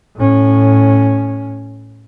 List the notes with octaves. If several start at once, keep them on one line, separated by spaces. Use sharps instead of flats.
A2 C#4